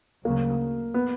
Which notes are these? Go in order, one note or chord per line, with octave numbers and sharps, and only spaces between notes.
D2 C#3 F#3 A#3
B3